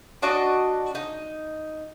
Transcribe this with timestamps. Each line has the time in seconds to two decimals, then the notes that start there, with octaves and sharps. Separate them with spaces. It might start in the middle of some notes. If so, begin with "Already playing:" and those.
0.22 D4 F#4 D5 D#5
0.95 D#4